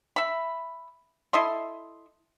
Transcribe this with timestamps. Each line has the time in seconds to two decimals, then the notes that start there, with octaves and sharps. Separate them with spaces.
0.16 E5 B5
1.33 E4 A4 D#5 C6